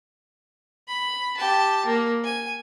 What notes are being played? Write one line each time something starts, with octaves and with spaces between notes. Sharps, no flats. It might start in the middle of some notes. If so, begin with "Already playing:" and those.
B5
G4 A5
A#3
G#5